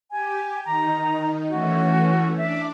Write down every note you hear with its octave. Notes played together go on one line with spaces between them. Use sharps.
G4 G#5
D#3 D#4 A#5
E3 A3 C#4 F#4
D4 D5 E5